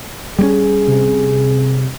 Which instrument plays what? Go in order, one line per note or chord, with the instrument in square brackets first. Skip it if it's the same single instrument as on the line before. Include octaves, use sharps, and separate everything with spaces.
[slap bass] G3 A#3 C#4 [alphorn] G#4
[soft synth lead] C3